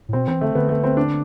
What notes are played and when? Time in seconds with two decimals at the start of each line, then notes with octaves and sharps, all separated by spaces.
0.09 A2
0.13 B2 C4
0.28 E3 C4
0.41 D3 A3
0.55 D3 B3
0.69 A3
0.84 C4
0.97 D4